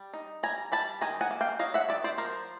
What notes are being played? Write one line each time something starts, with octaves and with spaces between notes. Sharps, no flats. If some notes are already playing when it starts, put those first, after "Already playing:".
Already playing: G3
D#4
G3 G#5 A#5
G3 A5 B5
D#3 G#5 A#5
F#5 G#5
A#3
F5 G5
F#3 D#5 F5
E5 F#5
D#3 D5 E5
C5 D5
F3 A#4 C5